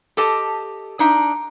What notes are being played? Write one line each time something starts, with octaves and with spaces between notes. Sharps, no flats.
G4 A4 D#5 A5
D4 D#4 E5